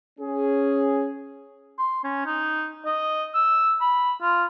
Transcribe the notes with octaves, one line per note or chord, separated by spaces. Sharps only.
C#4 G#4
C6
C#4
D#4
D#5
E6
B5
F4